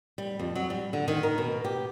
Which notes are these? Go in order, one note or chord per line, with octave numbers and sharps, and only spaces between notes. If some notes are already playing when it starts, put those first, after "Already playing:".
G3
F2
F#3
G3
D3
D#3
A#4
B2
G4